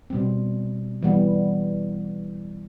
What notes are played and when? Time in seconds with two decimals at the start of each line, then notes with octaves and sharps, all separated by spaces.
0.10 B2 G3 C4
1.03 E3 G3 B3